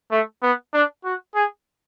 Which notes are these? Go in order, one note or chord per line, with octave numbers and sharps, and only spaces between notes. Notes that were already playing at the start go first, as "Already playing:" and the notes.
A3
B3
D4
F#4
G#4